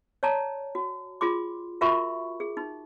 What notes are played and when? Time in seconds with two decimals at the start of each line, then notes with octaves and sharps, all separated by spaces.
0.23 C#5 D5 A5 A#5
0.75 F#4
1.21 F4 G#4 C6 D6
1.81 F4 F#4 A#4 E5 B5 C#6
2.40 G#4
2.57 D#4